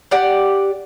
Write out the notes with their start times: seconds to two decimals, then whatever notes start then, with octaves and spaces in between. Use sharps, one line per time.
0.11 G4 D5 F#5